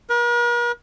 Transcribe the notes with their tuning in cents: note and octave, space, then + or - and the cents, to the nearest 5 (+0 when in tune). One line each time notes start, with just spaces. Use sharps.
A#4 +45